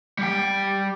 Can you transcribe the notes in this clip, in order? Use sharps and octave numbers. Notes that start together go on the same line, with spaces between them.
G3 G5